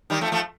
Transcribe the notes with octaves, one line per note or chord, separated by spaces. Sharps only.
D#3 G3
F3 A3
F3 A3